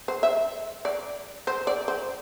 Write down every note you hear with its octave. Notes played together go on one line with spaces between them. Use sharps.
C5
E5
D5
C5
D5
C5